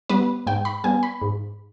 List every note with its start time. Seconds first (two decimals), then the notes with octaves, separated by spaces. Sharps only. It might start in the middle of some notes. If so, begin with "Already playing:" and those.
0.09 G3 B3 B4
0.47 G#2 G5
0.65 B5
0.84 G3 B3 G#5
1.03 B5
1.21 G#2